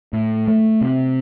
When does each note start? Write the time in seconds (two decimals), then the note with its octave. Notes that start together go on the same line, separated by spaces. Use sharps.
0.13 A2
0.48 A3
0.81 C3